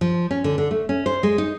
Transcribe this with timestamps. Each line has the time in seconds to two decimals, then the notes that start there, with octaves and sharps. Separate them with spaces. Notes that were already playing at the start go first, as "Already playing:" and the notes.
0.01 F3
0.31 C#4
0.44 D3
0.58 D3
0.71 A3
0.89 C#4
1.06 C5
1.23 G#3
1.38 D#4